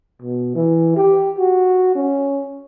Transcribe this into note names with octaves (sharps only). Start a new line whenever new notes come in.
B2
E3
G4
F#4
C#4